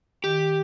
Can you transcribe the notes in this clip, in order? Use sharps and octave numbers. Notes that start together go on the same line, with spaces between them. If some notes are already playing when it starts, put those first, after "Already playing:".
D#3 G4